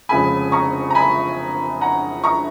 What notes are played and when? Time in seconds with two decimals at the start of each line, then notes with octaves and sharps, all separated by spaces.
0.09 F1 F2 C#3 G#3 G#5 B5
0.52 A#5 C#6
0.90 A#5
0.95 G#5 B5
1.81 F#5 A#5
2.24 A#5 C#6